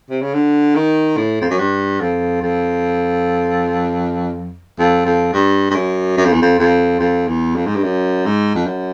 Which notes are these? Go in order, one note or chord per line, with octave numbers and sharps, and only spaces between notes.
C3
C#3
D3
D#3
A2
F2
F#2
G2
F2
F2
F2
F2
G2
G2
F#2
F#2
F2
E2
F2
F2
F2
E2
F2
G#2
G2
F#2
G#2
F2
F#2